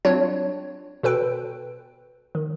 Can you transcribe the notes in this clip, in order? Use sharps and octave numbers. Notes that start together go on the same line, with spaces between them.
F#3 C4 D4 F4 C#5
B2 A4 B4 G5
D#3